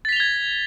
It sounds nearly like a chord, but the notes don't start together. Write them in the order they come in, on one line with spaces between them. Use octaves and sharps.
A6 B6 F7 G7 G#6